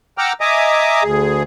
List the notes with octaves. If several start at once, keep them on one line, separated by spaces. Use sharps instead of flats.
F#5 G5 A#5 D6 E6 F6
D#5 E5 G#5 A#5 D6 D#6
D2 G#4